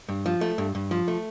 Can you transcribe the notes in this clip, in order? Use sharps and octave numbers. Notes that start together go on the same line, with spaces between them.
G2
F3
A3
G2
G2
F3
A3